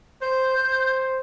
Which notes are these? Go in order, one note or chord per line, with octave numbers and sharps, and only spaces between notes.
C5 G6
C5